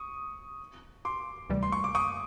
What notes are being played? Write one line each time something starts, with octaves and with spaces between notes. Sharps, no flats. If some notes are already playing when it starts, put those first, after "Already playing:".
Already playing: C#6 D#6
C6 D6
D2 C3 E3 G3
C6
C#6
D6
C#6 D#6